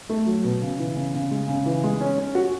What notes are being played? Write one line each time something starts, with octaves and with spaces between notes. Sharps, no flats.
A3
F#3
B2
C#3
E3
C#3
C#3
G#3
C#3
E3
G#3
C#4
C#4
F#4